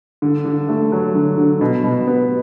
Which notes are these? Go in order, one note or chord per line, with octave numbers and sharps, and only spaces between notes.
D3
D3
A3
F#3
D3
D3
B2
B2
B3